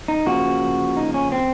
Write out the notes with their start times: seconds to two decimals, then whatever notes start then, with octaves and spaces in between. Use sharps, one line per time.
0.08 D#4
0.26 C#3 F3 A#3 F#4
0.97 D#4
1.14 C#4
1.32 C4